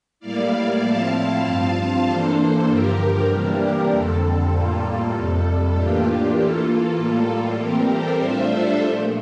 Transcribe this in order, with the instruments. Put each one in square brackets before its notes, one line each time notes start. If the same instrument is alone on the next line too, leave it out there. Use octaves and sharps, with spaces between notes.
[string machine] A2 G3 A#3 E4 D5 F5
A2 F3 C4 E4 F5 A5
G2 F3 C4 F4
E3 A#3 D4 A4 C5
G2 D3 F3 G4 A#4
C3 E3 G3 A#3 D4 G4 A#4
F2 D3 G3 C4 A4
A2 G3 A#3 F4
F2 C3 G3
A2 E3 A#3 D4 F4 G4
E3 A#3 F4 A4
A2 G3 A#3 F4 A4
A4
E3 G3 C4 G4 A#4
A4 C5
A2 G3 D4 F4 C5 E5
A4 C5
A#2 F3 A3